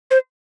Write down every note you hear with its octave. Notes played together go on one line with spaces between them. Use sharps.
C5